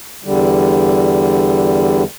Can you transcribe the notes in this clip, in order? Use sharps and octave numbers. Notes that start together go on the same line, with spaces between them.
E2 D3 G3